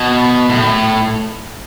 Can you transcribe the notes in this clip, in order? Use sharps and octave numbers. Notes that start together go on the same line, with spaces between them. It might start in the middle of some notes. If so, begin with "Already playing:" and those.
Already playing: B2
A2